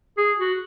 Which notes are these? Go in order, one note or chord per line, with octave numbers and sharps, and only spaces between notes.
G#4
F#4